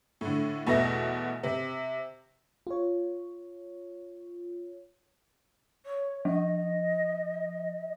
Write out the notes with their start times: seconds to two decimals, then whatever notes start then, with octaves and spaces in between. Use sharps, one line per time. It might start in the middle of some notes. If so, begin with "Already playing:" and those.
0.21 A2 D3
0.67 E2 B2 E3 A3 E5 A#6
1.43 C3
2.67 F4 C#5
5.85 C#5
6.25 F3 D#5